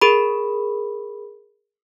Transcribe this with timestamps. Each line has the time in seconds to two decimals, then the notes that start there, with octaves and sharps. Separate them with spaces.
0.01 G#4 A#4 B5